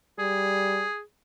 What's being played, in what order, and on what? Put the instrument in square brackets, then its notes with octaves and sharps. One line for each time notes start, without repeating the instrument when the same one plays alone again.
[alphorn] G3 [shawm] G#4